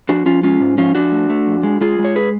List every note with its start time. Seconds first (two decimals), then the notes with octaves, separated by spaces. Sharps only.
0.09 F3 D4 F#4
0.26 F3 C#4 F4
0.43 G#3 C#4 F4
0.60 G#2
0.78 F3 C#4 F4
0.95 F3 D4 F#4
1.12 A3
1.30 A3
1.47 F2
1.63 G#3
1.81 G#3 F4 G#4
1.99 G#3
2.05 C#5
2.16 G#4 B4